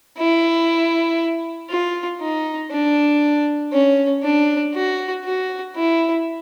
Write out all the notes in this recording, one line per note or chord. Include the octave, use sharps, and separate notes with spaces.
E4
F4
D#4
D4
C#4
D4
F#4
F#4
E4